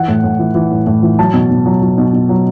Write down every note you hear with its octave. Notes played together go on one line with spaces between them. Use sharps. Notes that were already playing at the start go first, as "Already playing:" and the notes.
Already playing: E3 F#5
A2
A2
E3
E3
A2
A2
E3
F#3 A5
B2
B2
F#3
F#3
B2
B2
F#3